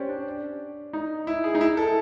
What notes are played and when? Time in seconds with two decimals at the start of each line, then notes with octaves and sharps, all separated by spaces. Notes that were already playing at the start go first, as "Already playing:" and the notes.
Already playing: C#4 G4 C5 D5
0.09 D4
0.93 D#4
1.27 E4
1.44 G#4
1.55 D#4
1.61 E4
1.77 A4